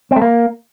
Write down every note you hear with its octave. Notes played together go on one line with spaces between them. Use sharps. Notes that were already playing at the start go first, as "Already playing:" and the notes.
C4
A3
A#3